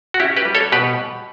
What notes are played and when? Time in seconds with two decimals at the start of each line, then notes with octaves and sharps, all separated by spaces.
0.14 F#4
0.20 C#4 E4 G4
0.37 G4 B4
0.45 G3
0.55 A4 C#5
0.72 B2 G4 B4